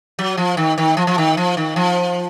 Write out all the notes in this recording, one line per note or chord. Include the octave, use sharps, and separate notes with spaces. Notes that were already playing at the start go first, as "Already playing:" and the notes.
F#3
F3
D#3
D#3
F3
F3
D#3
F3
D#3
F3